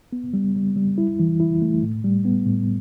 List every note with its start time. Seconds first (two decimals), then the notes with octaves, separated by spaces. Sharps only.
0.13 B3
0.34 G3
0.56 G3
0.76 G3
0.98 E4
1.20 E3
1.40 E4
1.62 A3
1.83 A2
2.04 G3
2.25 B3
2.46 A2